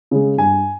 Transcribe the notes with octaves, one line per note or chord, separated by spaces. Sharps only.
C#3 G#3
G2 G#5